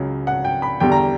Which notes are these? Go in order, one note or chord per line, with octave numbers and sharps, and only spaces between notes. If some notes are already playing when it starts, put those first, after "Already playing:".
Already playing: C#2 C#3 F#3
F#5
G5
B5
E2 D3 G3 G5
A#5